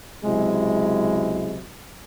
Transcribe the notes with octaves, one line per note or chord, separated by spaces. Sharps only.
C#2 C3 F#3 G#3 E4